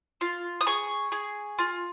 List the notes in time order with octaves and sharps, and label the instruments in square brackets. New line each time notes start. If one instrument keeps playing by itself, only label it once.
[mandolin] F4
D#6
G#4 C#6
G#4
F4